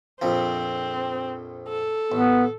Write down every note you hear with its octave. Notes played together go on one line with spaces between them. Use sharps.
A#1 F2 F3 C4
A4
A1 B3